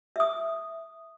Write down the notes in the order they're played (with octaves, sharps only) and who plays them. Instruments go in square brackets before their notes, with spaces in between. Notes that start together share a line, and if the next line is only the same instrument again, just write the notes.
[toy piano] E5 D#6